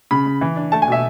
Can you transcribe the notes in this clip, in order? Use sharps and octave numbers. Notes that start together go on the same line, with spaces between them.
C#3 B5
C#3
E3
D4
A3 A5
G#5
B2 E5